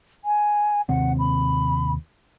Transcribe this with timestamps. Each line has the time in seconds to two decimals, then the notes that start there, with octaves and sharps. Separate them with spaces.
0.25 G#5
0.89 D#2 C3 C4 F#5
1.19 B5